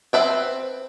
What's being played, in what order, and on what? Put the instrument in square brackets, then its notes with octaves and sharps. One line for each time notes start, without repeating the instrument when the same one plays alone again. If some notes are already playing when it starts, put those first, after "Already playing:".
[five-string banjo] C4 B4 E5 G5